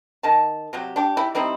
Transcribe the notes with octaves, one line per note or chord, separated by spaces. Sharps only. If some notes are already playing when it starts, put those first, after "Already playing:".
D#3 A5
C3 F#3 G4
D4 G4
E4 G4
G3 C4 D#4 E4